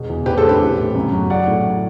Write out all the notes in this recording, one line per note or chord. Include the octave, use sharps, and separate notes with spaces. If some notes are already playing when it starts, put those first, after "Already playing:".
Already playing: E1 B2
E2
A1 G4 B4
A4 C5
G2
G4 B4
A1
A2
F#2
F#3
A1 D5 F#5
A2